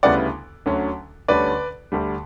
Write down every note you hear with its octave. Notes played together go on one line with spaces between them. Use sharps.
D2 C#3 G3 B3 E4 D5 F#5
D2 D3 F#3 C#4
D2 D3 G3 C#4 B4 D5
D2 D3 G3